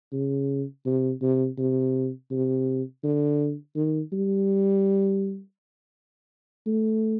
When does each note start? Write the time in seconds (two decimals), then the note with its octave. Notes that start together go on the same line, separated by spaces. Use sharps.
0.12 C#3
0.85 C3
1.22 C3
1.58 C3
2.31 C3
3.03 D3
3.75 D#3
4.12 G3
6.66 A3